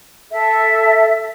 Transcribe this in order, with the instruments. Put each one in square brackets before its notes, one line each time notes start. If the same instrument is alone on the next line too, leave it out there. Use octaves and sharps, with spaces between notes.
[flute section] A4 E5